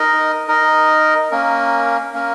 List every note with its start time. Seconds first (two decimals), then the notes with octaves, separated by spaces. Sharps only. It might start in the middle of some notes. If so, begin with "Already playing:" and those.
Already playing: D#4 A#4 D#5
0.48 D#4 A#4 D#5
1.31 A#3 C#4 A#4
2.13 A#3 C#4 A#4